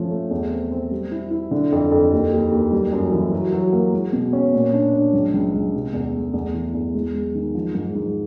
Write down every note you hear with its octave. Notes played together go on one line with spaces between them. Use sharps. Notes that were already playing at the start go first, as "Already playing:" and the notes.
Already playing: F3 A3 C#4
A3
E2
C4
C4
G3
E4
E4
D3
F2
F2
D#2
D#2
D#2
G3
F#2
E3
F#3
F#3
A#3
G#3
B2
C#4
A#2
D4
D4
C#2
C#2
C#2
C3
E2
A3
E2
E3
E2
G#3
G#3
D#3
F3
G#2
G#2